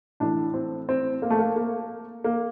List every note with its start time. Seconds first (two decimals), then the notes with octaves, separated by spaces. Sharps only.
0.20 A2 E3 D4
0.54 C4
0.89 C4
1.22 A#3
1.30 A3
1.39 A#3
1.56 A#3
2.24 A#3